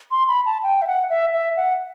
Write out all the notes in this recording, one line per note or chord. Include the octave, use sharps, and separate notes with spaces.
C6
B5
A5
G5
E5
F#5
E5
E5
F#5